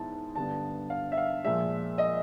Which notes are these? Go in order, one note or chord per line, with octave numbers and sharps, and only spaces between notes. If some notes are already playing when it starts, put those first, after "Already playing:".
Already playing: G#2 E3 G#3 B3 E4 A5
G2 D3 G3 B3 A5
F5
E5
F5
A#2 F3 G#3 E5
D#5